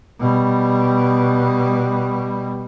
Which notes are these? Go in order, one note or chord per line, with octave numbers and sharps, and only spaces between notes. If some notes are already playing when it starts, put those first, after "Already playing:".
B2 G3